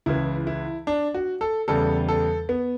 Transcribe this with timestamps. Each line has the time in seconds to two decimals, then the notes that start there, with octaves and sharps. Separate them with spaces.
0.06 C#2 C#3 E3 E4
0.47 E4
0.87 D4
1.14 F#4
1.41 A4
1.68 E2 C#3 G3 A4
2.09 A4
2.49 B3